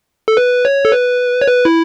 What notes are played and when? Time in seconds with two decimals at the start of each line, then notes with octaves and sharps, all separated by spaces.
0.28 A4
0.37 B4
0.65 C#5
0.85 A4
0.92 B4
1.42 C#5
1.47 B4
1.65 E4